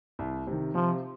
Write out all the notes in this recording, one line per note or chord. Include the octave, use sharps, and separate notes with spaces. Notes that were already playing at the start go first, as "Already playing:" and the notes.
C2
C3 D#3
C3 F3